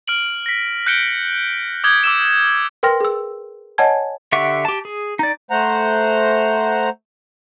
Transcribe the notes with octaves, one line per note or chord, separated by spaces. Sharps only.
F6 D7 F#7
A#6 B6
F#6 G6 C#7 D7 G7
D6 D#6 G6 G#6 G7
D6 E6 E7
A#4 B4 G5 C6 F6 A#6
G#4 E6
C#5 D#5 F#5 G#5 A5 G#6
D3 G4 E5 F#5 C#6
G4 A5
G#4
D#4 D5
A3 C5 F#5 A#5